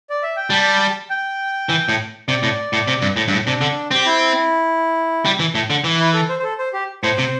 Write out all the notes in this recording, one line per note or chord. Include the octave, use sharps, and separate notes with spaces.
D5
E5
G5
G3 A5
G5
E3
A2
C3 D5
A2
A2
C3
G2
A2
G2
A2
C3 D4
D3
C4 G4
E4
G3
E3
A2
D3
E3
E4
A4
C5
C5
A4
C5
G4
A2 C5
C3